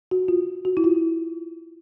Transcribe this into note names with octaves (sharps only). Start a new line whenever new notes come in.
F#4
F4
F#4
E4
F4